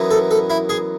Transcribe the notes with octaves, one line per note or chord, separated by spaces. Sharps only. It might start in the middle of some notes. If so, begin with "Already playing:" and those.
Already playing: F#2 E3 B3 D#4
A4
A4
E4
G#4